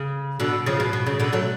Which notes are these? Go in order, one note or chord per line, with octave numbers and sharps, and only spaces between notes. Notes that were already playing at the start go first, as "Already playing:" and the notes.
Already playing: C#3
B2 D3
C#3 F3
B2
B2
C#3
B2 D3
F#3 A3